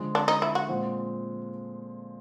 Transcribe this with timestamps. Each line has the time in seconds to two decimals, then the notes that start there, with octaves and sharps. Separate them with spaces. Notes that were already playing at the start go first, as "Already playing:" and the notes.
Already playing: D3 F3 G#3
0.15 D4
0.28 D#4
0.42 E4
0.55 F#4
0.68 A#2 F3 G#3 C4